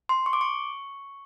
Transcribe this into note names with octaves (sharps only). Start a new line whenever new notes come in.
C6
C#6
D6
C#6